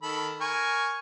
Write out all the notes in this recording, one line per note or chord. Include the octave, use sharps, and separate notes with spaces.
D#3 A4 B5
A#4 G#5 C#6